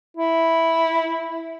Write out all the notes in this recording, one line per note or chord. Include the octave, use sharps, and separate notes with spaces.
E4